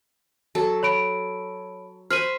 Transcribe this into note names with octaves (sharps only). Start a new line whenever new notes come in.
F#3 A4
C#5 B5 D7
C5 B5 C#6 F6 D#7